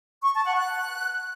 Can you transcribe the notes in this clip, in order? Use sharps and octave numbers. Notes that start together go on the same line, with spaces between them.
C#6
A5
F#5
F#6